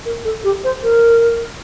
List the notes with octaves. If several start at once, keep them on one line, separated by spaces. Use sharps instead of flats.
A#4
A4
G4
C5
A#4